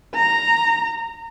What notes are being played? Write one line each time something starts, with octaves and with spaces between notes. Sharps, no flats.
A#5